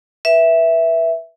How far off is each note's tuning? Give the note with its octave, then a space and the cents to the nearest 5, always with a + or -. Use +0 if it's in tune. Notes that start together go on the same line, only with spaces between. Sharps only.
B4 -20 E5 +0